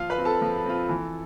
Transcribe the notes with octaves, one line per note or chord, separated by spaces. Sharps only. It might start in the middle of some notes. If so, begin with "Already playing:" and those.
Already playing: F3 F4 F5
B4 B5
C4 F4
A4 A5
F3
C4 F4
E3